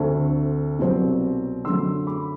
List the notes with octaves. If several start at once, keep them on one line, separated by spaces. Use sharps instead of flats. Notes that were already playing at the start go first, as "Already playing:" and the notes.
Already playing: D2 D3 A3 C4
C2 B2 F#3 C4
F#2 D3 F#3 A3 C6 E6
B5 D6